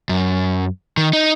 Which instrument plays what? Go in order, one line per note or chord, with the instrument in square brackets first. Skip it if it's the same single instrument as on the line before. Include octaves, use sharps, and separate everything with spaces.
[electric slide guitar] F#2
D#3
D#4